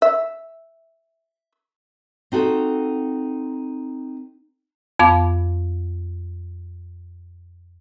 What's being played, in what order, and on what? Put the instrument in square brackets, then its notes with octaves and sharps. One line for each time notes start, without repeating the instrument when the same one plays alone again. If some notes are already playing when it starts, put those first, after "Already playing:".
[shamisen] E5
[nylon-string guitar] C4 D#4 F#4 A4
[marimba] F2 B3 F5 B5 D6